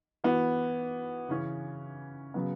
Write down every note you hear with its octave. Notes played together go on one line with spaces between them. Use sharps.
E3 B3 F#4
C#3 E3 C#4
C#3 F#3 B3